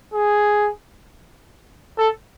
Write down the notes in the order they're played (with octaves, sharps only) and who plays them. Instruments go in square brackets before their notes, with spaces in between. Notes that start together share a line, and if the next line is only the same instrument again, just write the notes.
[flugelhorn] G#4
A4